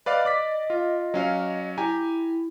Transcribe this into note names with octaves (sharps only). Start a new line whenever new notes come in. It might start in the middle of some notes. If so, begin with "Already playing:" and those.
B4 D5 D#5 F5
D5 D6 B6
F4
F#3 C#4 F5
E4 G4 G#5 A#5